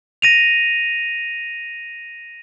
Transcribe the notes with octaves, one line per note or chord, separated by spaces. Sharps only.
A#6 D#7 F7